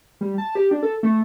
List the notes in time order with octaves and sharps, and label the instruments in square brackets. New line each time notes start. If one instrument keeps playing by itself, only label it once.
[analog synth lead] G3
A5
G4
D4
A4
A3